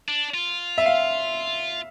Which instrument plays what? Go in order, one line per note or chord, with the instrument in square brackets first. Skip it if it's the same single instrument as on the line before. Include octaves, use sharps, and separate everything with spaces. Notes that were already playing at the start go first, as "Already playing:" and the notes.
[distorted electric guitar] D4
F4
[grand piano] E5
F5